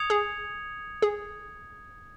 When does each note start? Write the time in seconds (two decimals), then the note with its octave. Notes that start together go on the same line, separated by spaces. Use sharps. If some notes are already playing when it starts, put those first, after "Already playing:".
Already playing: D#6 G#6 C#7 F7
0.10 G#4
1.02 G#4